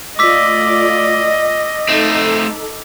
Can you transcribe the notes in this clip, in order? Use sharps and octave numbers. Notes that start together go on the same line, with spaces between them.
A3 F4 D5 D#5 D6 E6 B6
A3 C4 D#4 A4